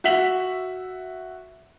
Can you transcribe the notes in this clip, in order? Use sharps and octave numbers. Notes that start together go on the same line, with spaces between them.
F#4 E5 B6 F#7